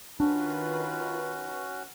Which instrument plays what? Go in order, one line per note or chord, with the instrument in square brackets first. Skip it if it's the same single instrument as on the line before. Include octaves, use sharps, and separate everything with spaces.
[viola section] D#3 F4 B4 [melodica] C#4 F#4 [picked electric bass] D4